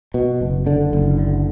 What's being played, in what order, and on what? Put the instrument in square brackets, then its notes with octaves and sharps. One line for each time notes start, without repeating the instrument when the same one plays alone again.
[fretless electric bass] B2
F#1
D3
F#1
D3